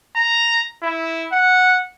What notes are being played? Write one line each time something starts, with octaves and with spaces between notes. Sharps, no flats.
A#5
E4
F#5